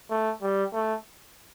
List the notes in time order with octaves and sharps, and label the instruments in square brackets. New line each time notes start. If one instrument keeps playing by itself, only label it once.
[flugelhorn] A3
G3
A3